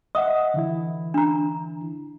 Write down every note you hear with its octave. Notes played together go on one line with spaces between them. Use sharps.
D#5 E5 F#5 D#6
D3 E3 E4
D4 A#5